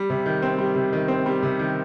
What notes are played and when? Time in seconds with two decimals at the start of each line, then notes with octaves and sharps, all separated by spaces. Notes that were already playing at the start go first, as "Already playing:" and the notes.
Already playing: G3
0.10 C3
0.26 D#3
0.42 C4
0.58 G3
0.75 C3
0.93 D#3
1.08 C4
1.26 G3
1.43 C3
1.59 D#3